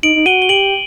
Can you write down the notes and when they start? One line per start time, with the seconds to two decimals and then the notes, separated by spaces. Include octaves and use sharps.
0.03 D#4 D7 F#7
0.16 D#4
0.26 F#4 D#7 G7
0.42 G7
0.49 G4 D7 F#7